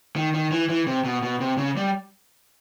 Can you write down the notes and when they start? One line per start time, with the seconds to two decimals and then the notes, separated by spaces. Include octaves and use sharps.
0.16 D#3
0.34 D#3
0.52 E3
0.69 E3
0.87 C3
1.05 B2
1.23 B2
1.40 C3
1.58 C#3
1.77 G3